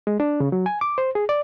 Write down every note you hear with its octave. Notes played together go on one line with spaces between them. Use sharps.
G#3
D4
C#3
F#3
G#5
D6
C5
G#4
D5